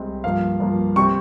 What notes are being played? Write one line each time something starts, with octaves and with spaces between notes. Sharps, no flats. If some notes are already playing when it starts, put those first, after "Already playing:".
Already playing: C2 G#3 C4
G2 F3 A#3 F5
G2 F3 A#3
C3 G3 C4 C#6